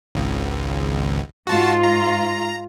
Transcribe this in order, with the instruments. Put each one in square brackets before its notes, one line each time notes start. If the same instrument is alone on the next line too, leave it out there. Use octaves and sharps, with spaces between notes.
[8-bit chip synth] G#1 C#2
[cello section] G#2 F4 [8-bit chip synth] F#4 A5
[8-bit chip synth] A#5